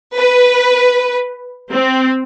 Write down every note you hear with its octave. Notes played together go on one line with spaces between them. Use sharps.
B4
C4